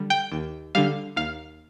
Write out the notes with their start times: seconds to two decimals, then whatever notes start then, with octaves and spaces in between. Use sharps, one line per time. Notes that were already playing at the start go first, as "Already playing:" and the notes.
Already playing: D3 G3
0.10 G5
0.32 D#2
0.75 D3 G3 F5
1.16 D#2 F5